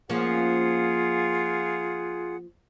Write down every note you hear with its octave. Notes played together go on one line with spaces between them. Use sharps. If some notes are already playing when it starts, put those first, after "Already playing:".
F3 A#3 C#4 F4 G#4 F#5